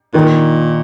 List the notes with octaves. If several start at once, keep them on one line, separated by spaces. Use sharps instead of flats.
A#2 D#3